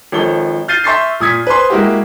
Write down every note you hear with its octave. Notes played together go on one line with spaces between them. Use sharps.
G#1 F3 D#4 A4 C#5 G7
F6 G6 A6 C7 D#7 G7
E5 C6 C#6 G6 A6 C7
A#2 D#6 G#6 B6
B4 C5 C6
G#3 A#3 E4 F#4 G4